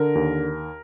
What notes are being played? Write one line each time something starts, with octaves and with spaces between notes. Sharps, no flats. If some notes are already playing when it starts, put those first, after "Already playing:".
Already playing: D3 A#4
D#2